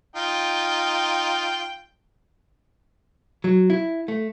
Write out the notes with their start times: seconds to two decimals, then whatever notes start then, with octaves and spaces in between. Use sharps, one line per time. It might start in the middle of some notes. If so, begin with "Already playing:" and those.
0.16 D#4 F4 G5
3.44 F#3
3.70 E4
4.08 A3